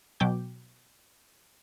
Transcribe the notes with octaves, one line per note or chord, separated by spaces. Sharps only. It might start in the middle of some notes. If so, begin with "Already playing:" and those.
B2 F#3 G5 D6 G6